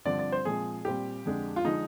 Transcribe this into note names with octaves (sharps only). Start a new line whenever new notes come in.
G2 D3 F3 C4 D5
D5
C5
A#2 F3 G#3 C4 G#4
A#2 G3 C4 G4
F2 D3 G#3 D4
F4
D3 F3 G#3 D#4